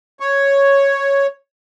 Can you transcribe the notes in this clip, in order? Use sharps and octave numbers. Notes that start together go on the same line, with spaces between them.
C#5